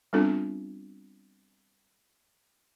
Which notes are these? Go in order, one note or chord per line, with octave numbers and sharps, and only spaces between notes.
G3 B3 C4 D4 F4 A4